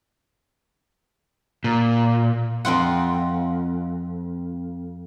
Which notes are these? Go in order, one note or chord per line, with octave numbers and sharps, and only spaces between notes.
A#2
F2 C4 F4 F#5